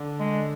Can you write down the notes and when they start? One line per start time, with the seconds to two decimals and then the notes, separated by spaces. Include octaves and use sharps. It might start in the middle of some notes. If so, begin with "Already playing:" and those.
Already playing: D3
0.20 G#3